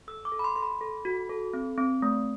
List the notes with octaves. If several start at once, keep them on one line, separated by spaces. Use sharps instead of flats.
A4 E6
D6
A4
B5
C6
A4 C6
B5
A4
F#4
A4
C4
C4
A3